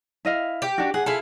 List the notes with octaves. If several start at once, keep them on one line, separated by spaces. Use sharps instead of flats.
E4 D#5 F5
G4
D4 F#4
G#4 F#5
E4 F4 G#4 A4